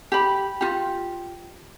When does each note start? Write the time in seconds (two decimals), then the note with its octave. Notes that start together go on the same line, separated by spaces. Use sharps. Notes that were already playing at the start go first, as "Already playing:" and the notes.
0.12 G4 B5
0.61 F4 G4